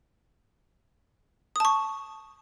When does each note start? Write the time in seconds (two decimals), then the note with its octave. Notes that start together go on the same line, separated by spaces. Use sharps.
1.56 D#6
1.60 A5
1.65 C#6